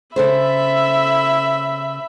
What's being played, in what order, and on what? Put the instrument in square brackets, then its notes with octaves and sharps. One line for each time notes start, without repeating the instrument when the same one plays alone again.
[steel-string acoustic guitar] C#3 A4 C5 [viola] E5 B5